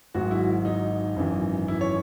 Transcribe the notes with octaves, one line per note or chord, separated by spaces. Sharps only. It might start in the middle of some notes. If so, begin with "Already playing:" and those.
G#1 G#2 F#3 F#4
E4
D#4
G#1 F#2 E3
E4
C#5